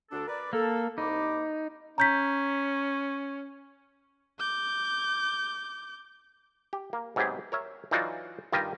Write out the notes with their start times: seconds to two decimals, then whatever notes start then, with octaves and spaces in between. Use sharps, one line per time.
0.11 D2 D4 A4
0.28 A#4 B4 D5
0.53 A#3 A4
0.98 C2 D#4 B5 D6
1.98 C#4 A#5 G6 B6
4.40 D6 G6
6.73 G4
6.93 A#3
7.16 G#2 C3 F#3 B3 G4 G#4
7.52 A#4 C#5 E5
7.91 E3 F#3 D#4 F4 F#4 D5
8.52 G2 D#3 G3 F4 G4 D#5